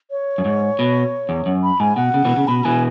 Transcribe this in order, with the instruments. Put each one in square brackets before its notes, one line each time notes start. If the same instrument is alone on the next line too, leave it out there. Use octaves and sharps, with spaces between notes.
[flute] C#5
[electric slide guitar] F#2
G#2
B2
E2
F#2
[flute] B5
[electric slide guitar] G#2 [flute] G#5
[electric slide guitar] B2 [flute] F#5
[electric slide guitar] C#3
B2 E3
C#3
[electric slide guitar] B2 [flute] B5
[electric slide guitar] B2 E3 [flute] G#5